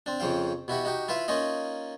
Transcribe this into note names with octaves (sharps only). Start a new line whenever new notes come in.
C4 D4
F2 C#3 F3 F5 G5
B2 E4 F#4 G4
D#4 F#4 G4
E4 F4 B4 E5 F5
A#3 C#4 D#4 F4 D#5